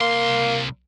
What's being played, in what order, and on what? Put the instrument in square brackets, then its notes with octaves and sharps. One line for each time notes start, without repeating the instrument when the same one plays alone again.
[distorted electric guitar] C2 C6 [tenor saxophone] A#3